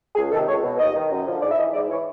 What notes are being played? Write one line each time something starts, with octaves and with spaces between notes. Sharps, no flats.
C#2 G#4
C3 D#3 A4
C#2 C#5
B2
D#2 D#5
D#3
F#2
D3 F3
G#2 D5
E5
E3 D#5
G#2 D5
E3 C#5